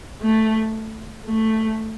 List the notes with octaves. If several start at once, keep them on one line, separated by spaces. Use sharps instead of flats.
A3
A3